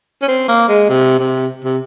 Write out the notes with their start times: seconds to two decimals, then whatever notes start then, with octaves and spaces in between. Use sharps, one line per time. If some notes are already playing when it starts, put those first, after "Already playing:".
0.22 C#4
0.28 C4
0.48 A#3
0.68 G#3
0.89 C3
1.19 C3
1.64 C3